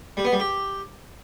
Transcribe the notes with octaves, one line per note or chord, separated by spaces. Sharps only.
G3
B3
G3
G4